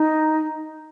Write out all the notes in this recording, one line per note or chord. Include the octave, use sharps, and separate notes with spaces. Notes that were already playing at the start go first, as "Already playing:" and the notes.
Already playing: D#4